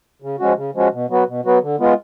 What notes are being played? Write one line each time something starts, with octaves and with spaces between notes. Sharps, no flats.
C#3
F3 G#3 C#4 F#4
C#3
F3 G#3 C#4 F#4
B2
F#3 B3 F#4 B4
B2
F#3 B3 F#4 B4
D3
G#3 B3 F4